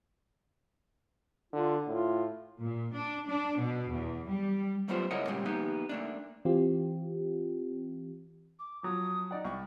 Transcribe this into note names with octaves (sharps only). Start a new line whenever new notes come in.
D3 F4
A2 F4
A#2
D4
D4
B2
E2
G3
F#3 G3 A3 B3 F4 C5
C#2 E4 A#4 C#5 D#5 F#5
A#2 C#3 G3 G#3
F3 A#3 B3 D#4 G4
A3 A#3 D4
E3 C4 F4 G4
D6
F3 F#3 D#6
D#4 D5 F#5
C2 C#6